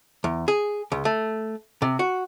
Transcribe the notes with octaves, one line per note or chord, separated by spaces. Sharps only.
E2
G#4
C#2
A3
C3
F#4